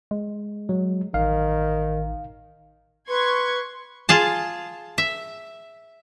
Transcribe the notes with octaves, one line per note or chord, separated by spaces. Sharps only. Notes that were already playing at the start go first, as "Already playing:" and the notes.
G#3
F#3
A1 D#3 F5
B4 C6 C#6 G#6
F4 G#4 A5
E5